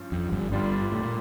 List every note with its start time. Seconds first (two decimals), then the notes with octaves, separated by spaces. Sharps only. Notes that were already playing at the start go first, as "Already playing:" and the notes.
Already playing: G2 F3 C#4
0.12 F2
0.32 G1 G2
0.52 G1 G2 D3 G3 D4 F4
0.92 A2
1.03 A#2